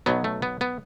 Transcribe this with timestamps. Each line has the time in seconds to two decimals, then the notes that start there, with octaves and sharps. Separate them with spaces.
0.06 B1 B2 F#3 B3
0.24 A3
0.42 B3
0.61 B3